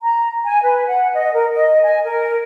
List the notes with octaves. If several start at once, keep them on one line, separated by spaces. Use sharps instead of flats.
A#5
G#5
B4
F#5
D#5
A#4
D#5
G#5
A#4